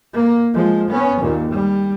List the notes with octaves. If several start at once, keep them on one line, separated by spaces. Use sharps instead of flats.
A#3
F3 G#3
B3 C#4
D#2 A#2
G3